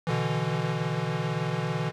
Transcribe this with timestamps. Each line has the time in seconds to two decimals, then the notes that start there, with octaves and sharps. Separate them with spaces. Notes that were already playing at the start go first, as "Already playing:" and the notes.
0.07 B2 D3 E3